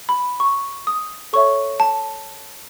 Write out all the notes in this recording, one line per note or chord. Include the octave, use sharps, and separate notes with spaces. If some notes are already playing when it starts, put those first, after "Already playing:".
B5
C#6
D#6
A4 C#5 E5 C#6
A5